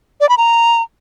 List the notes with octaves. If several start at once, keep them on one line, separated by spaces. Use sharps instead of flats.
D5
B5
A#5